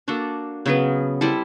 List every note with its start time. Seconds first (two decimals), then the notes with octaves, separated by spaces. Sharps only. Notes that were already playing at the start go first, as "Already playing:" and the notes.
0.08 A#3 D4 F#4 A4
0.66 C#3 F#3 B3
1.21 G3 C4 E4 A4